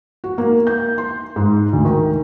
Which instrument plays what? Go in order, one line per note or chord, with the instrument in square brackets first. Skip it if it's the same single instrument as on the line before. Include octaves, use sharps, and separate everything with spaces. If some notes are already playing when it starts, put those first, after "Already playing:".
[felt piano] F#4
A#3
G6
C6
G#2
D2
D#3